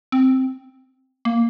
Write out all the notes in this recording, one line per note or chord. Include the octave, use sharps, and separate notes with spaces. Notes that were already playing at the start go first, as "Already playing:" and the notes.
C4
A#3